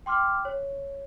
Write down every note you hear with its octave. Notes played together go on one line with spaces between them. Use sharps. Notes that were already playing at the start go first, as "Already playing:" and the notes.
G5 C6 D6 F6
C#5